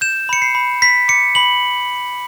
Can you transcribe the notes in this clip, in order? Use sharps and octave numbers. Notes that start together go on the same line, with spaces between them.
G6 E7
B5 C#7
C7
B5
B5 B6
D6 C#7
B5 F#7